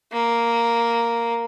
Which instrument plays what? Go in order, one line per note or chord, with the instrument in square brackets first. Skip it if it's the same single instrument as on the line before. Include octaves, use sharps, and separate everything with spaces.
[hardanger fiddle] A#3